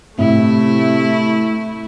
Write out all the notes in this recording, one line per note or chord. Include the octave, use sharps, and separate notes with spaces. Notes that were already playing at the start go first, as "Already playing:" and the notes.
A2 C3 A3 E4